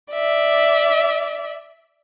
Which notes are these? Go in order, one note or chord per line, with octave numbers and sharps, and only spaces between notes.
D5 E5